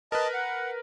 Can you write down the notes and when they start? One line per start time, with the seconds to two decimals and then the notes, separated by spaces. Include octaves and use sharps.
0.12 A#4 B4 D#5 A5
0.34 F#5